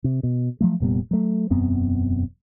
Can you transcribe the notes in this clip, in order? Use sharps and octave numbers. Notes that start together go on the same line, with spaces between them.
C3
B2
F3 F#3 A3
F1 A#2 G3 B3
F#3 A3
E1 F#2 B3 C4